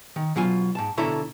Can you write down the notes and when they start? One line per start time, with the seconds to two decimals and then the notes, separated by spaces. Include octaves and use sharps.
0.16 D#3
0.36 B2 F#3 F4 G#5
0.75 G#2 A5
0.98 B2 D3 E4 A4 C#5 A#5